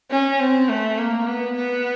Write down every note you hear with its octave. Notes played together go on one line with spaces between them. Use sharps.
C#4
C4
A3
A#3
B3
B3